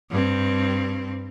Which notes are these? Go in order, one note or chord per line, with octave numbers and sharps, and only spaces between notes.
G2 C4